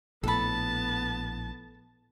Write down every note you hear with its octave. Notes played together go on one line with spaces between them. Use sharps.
A#1 A2 B3 A4 A5 B5